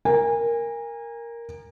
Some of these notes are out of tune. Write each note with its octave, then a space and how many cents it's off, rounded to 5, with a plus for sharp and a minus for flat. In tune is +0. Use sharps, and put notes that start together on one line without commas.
A#4 +0 G#5 -30